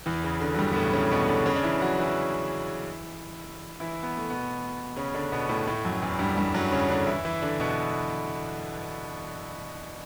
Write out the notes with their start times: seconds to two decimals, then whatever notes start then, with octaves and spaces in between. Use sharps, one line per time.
0.06 E2 E3
0.24 C#3
0.41 D3
0.55 F#3
0.59 G2 G3
0.72 B3
0.76 A2 A3
0.93 C#3 C#4
1.11 B2 B3
1.28 D3 D4
1.46 C#3 C#4
1.56 D4
1.63 E3 E4
1.81 F#3 F#4
1.99 E3 E4
3.80 E3 E4
4.03 B3
4.17 A3
4.30 B2 B3
4.96 C#3 C#4
5.14 D3 D4
5.32 B2 B3
5.49 A2 A3
5.67 A2 A3
5.85 F#2 F#3
6.02 E2 E3
6.19 G2 G3
6.37 G2 G3
6.54 F#2 F#3
6.72 C#3 C#4
6.89 D3 D4
7.07 E3 E4
7.25 E3 E4
7.42 D3 D4
7.60 B2 B3